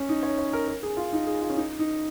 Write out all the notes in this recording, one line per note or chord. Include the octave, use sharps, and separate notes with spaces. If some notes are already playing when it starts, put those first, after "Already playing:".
Already playing: C#4
D#4
C#5
C#5
A#4
A#4
G#4
F4
D#4
G#4
F4
C#4
D#4
D#4